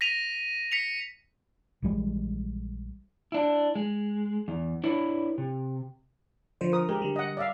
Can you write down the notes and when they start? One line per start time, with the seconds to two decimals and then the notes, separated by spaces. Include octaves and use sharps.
0.01 A#6 B6 D#7 F7
0.72 B6 C#7 F7
1.82 A#1 E3 G3 G#3
3.32 D4 E4
3.75 G#3
4.48 E2
4.84 D4 E4 B4 C#5
5.38 C3
6.61 D3 F3 C5
6.72 A#4 D#6
6.89 G#3 G4 A#4
7.02 D3 G3
7.16 D#5 F#5
7.37 D5 E5 F5